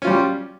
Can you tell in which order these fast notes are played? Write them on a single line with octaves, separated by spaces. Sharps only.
C#4 F4 G3